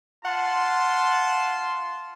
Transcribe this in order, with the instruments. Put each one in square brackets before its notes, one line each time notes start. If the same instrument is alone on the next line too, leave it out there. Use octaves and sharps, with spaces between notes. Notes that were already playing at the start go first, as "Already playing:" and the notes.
[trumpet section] F4 A5 C6 [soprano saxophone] F#5